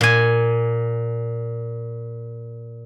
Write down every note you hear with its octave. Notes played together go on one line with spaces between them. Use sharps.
A#2 G#5